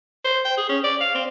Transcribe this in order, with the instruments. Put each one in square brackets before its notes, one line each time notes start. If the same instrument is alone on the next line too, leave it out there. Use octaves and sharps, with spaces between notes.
[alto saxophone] C5
G5
G#4
C#4
D5
F5
C4